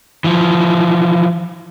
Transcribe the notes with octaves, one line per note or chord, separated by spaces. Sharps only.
E3 F3